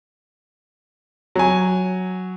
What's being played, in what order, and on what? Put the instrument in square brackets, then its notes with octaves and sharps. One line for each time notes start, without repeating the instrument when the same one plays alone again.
[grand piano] F#3 G#5